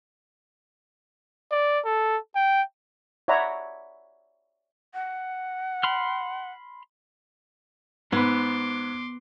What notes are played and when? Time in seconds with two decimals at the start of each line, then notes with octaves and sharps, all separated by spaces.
1.51 D5
1.85 A4
2.35 G5
3.28 C#5 D5 E5 F#5 A#5 B5
4.94 F#5
5.83 B5 C6 F6
8.12 G#2 B3 B4 C6 D6